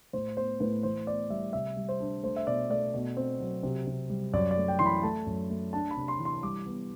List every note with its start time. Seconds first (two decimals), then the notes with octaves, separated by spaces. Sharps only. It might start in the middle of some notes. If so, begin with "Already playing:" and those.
0.13 A2 C5
0.37 B3 C5
0.60 A2 B4
0.83 E3 C5
1.07 B3 D5
1.30 G3 E5
1.53 C3 E5
1.77 G3
1.89 C5
2.00 D4
2.23 A3 C5
2.36 E5
2.47 B2 D5
2.70 A3 D5
2.94 B2
3.17 C4
3.40 F#3
3.63 C3
3.87 C3
4.10 G3
4.33 F#2 D5
4.51 D5
4.57 A3
4.68 G5
4.79 E3 C6
4.86 B5
5.03 A3 A5
5.26 F#2
5.50 A3
5.73 D4 A5
5.91 B5
5.96 C3
6.08 C6
6.20 E3
6.25 C6
6.43 G3 D6
6.66 B3